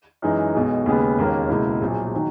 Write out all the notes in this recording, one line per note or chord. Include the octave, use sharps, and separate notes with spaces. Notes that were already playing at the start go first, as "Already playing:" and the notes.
F#2 E3 G#3 D#4
B1 B2 G#3
D#2 C#3 G#3 B3
E1 D#2 D#3 A#3 C#4
C#2 B2 A#3 E4
A#1 A#2 F#3
D#3 F#3